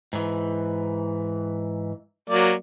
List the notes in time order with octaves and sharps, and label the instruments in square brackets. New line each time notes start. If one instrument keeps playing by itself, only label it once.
[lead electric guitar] G#2 E3
[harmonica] F#3 A#3 D5